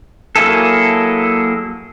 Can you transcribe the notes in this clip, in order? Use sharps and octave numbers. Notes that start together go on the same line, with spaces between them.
F#3 A#3 E4 G#4 A4